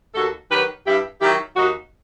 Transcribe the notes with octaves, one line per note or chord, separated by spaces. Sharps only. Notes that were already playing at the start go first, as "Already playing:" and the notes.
D#2 F#4 A4
D#3 F#3 G4 B4
G2 E4 G4
D#3 F#3 E4 G4
D#2 D#4 F#4